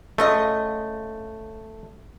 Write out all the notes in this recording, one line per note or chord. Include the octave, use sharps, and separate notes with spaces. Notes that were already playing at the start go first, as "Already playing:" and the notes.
C#3 A3 F4 D#5